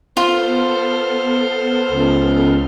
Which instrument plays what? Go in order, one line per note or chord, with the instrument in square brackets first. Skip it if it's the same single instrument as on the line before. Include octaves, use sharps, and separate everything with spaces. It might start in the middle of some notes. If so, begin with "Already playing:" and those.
[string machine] B3 A4 F6 [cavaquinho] F4 [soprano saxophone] C5
[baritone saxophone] C#2